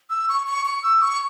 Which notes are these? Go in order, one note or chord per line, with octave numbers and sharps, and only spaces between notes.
E6
C#6
C#6
C#6
E6
C#6